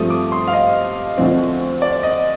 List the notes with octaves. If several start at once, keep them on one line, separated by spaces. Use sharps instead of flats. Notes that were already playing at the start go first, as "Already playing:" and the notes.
Already playing: G2 F3 A3 C4 D#6
D6
C6
F5
D#5
D2 D3 F3 C4
D5
D#5